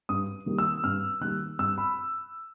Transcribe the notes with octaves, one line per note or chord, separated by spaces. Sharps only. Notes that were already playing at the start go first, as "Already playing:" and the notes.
G2 D#6
D#3 G3 A#3
E6
G2 F6
D#3 G3 A#3 F#6
G2 E6
B5